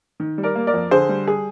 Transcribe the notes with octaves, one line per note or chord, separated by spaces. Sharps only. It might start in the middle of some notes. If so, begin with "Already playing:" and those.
D#3
G3
A#4 D5
A#3
A#4 D5
F2
D3 G#4 C5
G3
G#4